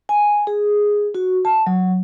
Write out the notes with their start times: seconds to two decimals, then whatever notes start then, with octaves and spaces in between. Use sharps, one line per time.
0.09 G#5
0.47 G#4
1.15 F#4
1.45 A5
1.67 F#3